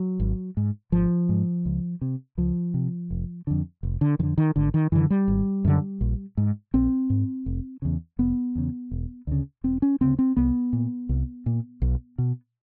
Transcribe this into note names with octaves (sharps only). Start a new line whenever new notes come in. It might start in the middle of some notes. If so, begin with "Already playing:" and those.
Already playing: F#3
G#1
G#2
G#1 F3
G#2
C#2
C3
C#2 F3
C3
F1
F2 D3
F1
D3
F2 D3 D#3
D#3
G#1 D3
D#3
F#2 D3 E3
G3
G#1
F#2 D3
A#1
G#2
A#1 C4
G#2
F1
E2 C#3
F1 B3
E2 C#3
E1
D2 C#3
E1 C4
C#4
D2 C#3 C4
C4
C2 B3
A#2
C2
A#2
B1
B2